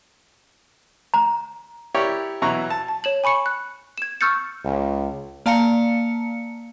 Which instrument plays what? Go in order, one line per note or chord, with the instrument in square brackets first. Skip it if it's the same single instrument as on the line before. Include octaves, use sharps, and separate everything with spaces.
[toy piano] A#5
[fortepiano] E4 G4 A#4 C#5 D5
B2 E3 F#3 E4 A#5 C#6
A5
[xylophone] A5
C#5 E7 F#7
G#5 B5 C#6 C#7
F#6
G#6 E7
C#6 E6 F6 G6 A6 C#7
[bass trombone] C#2
[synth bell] A#3 D5 F5 A5 A#5 C#7